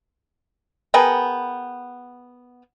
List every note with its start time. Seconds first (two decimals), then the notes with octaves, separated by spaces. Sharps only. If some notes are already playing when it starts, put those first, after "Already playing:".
0.94 B3 G#4 A#4 G5